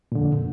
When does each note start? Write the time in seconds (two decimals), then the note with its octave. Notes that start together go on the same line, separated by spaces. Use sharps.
0.12 A#2
0.15 D3
0.19 F2